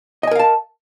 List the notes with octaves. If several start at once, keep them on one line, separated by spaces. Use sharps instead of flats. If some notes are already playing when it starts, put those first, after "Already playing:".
A#4 D#5 F5 G#5 A5